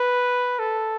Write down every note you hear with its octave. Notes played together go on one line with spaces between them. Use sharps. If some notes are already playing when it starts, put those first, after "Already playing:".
Already playing: B4
A4